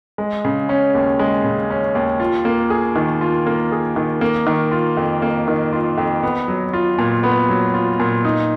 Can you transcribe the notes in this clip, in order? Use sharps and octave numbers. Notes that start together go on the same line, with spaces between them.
G#3
C#3
C#4
D#2
G#3
C#3
C#4
D#2
F4
A#3
G#4
D#3
F4
A#3
G#4
D#3
A#3
D#3
F4
F2
A#3
D#3
F4
F2
B3
F#3
F4
A#2
B3
F#3
F4
A#2
D#4